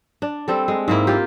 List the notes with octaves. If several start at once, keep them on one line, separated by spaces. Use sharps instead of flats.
D4
G3 C4 A4
G#3
G#2 A#3 E4
F4 G4